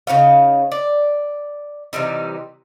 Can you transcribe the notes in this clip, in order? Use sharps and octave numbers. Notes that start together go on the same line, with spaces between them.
C#3 D#4 C#5 F5
D5
C3 E3 G3 D#4